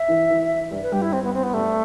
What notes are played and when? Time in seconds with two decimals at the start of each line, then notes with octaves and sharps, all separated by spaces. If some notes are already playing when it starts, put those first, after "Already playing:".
Already playing: E5
0.08 E3 E4
0.30 E3 E4
0.71 G2 G3
0.82 B4
0.92 G2 G3 G4
1.02 E4
1.13 C4
1.24 B3
1.34 C4
1.43 B3
1.54 G2 G3 A3